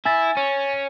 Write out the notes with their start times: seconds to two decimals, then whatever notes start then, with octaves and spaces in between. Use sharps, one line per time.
0.05 E4 G#5 A6
0.37 C#4